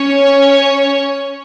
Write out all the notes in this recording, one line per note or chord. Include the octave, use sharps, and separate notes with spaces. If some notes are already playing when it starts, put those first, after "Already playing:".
Already playing: C#4 C#5